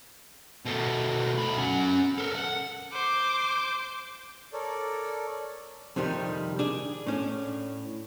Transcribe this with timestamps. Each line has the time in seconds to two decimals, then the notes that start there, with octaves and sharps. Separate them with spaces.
0.65 B2 A3
1.38 D2 B5
1.58 C#4 F#5
2.18 A4 A#4
2.35 F#5
2.93 C5 D6
4.53 A4 A#4 C#5 D5
5.96 F2 C3 D#3 G3
6.59 D4 G#4
7.07 A2 C#4 D4